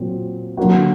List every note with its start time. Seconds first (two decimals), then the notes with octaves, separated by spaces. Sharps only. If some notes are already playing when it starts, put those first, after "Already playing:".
Already playing: A#2 F#3 C4
0.57 D3 F#3 A#3 F#4